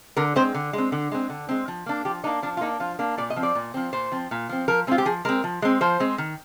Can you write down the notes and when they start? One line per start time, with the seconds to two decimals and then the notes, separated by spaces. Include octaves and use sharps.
0.17 D3 A#4
0.36 G#3 C4 C5
0.54 D3
0.73 G#3
0.78 C4
0.92 D3
1.12 G#3 C4
1.30 D3
1.49 G#3 C4
1.68 F3
1.86 A#3 D4
2.05 F3 G4
2.24 D4 D#4
2.26 A#3
2.43 F3 D4
2.57 F4
2.61 A#3 D4 D#4
2.80 F3 F4
2.99 A#3 D4
3.18 A#2 D5
3.30 D#5
3.36 F3 C4
3.43 D5
3.55 A#2
3.74 F3 C4
3.93 A#2 C5
4.12 F3 C4
4.31 A#2
4.49 F3 C4
4.68 F3 A#4
4.87 G#3 C4 F4
4.98 G4
5.05 F3 G#4
5.25 G#3 C4 A#4
5.44 F3
5.62 G#3 C4
5.81 F3 C5
6.00 G#3 C4
6.18 D#3